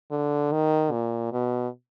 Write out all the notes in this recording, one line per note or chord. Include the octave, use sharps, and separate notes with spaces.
D3
D#3
A#2
B2